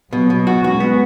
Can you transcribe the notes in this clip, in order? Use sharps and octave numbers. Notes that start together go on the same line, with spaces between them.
B2 F#3 B3
B2
F#4
G#3 C#4 F#4
B3